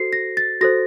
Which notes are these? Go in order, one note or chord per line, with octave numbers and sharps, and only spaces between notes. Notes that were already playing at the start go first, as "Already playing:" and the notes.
Already playing: F#4 A4 C5 C7
A#6
A6
F#4 A4 C5 A#6